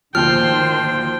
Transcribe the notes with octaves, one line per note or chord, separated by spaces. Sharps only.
D2 A#2 D#3 F3 C5 G5 F6